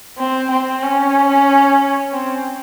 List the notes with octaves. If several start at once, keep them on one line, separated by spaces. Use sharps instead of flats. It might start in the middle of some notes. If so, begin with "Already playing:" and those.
C4
C4
C#4
C4